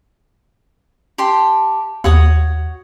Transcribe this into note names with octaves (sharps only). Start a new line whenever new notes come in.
G4 A5 C6
D#2 F#4 C#5 D#6